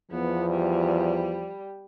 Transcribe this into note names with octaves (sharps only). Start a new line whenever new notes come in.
E2 F3 B3
G3